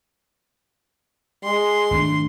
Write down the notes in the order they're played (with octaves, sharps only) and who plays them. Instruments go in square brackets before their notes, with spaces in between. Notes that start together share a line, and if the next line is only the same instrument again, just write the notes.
[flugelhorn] G#3 [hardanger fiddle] C6
[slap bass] G#1 A3 D4